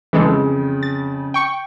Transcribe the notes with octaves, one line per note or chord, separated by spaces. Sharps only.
F2 C#3 E3 G#3 A4
A6
G5 C#6